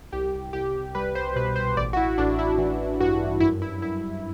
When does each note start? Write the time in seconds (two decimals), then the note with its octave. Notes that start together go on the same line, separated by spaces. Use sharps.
0.12 C2 G4
0.53 C2 G4
0.95 G3 B4
1.15 C5
1.36 B2 B4
1.56 C5
1.77 A1 D5
1.93 F#4
1.97 E4
2.18 A1 D4
2.39 E4
2.58 E3
3.00 G2 F#4
3.40 F#2 E4
3.62 E4
3.82 F#2 E4